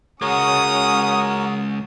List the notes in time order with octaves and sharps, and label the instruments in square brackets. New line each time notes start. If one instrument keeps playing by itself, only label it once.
[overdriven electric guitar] C#2 G#3 [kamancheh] C#4 F#5 [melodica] F#4 A#4 C#5 [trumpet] D#6